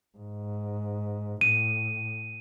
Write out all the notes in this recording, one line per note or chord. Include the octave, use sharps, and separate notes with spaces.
G#2
A2 D#7